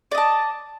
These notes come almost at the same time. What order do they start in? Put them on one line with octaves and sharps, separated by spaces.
D5 D#5 A5